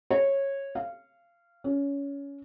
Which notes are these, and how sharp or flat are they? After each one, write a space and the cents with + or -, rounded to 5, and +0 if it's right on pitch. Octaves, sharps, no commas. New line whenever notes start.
C#5 -15
F5 -20
C#4 +20